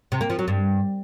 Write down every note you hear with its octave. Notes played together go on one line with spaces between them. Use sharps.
C3
A#3
F3
F#3
G2